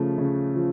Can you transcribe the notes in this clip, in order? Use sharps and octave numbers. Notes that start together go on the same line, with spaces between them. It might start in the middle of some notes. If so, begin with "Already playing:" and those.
Already playing: C#3 F3 A3
C#3
F3